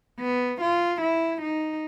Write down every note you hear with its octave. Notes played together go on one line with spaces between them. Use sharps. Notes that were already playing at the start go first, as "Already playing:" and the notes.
B3
F4
E4
D#4